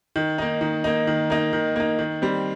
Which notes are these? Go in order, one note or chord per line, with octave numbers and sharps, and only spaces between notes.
D#3
A#3 D#4
D#3
A#3 D#4
D#3
A#3 D#4
D#3
A#3 D#4
D#3
G3 C4